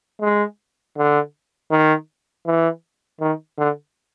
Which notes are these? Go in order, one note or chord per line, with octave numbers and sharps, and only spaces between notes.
G#3
D3
D#3
E3
D#3
D3